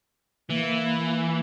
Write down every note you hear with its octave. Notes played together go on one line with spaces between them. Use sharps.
E3 A#3